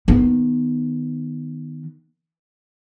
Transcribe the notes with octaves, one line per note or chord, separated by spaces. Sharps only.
D#3 B3